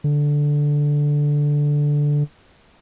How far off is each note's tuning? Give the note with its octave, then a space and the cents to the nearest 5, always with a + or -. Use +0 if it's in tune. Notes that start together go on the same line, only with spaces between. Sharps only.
D3 -5